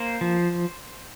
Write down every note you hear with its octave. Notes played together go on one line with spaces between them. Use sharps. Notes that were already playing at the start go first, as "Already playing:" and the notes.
Already playing: A#3 C5
F3